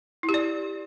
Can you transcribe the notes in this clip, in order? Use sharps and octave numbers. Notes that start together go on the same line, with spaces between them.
E4
G4
D5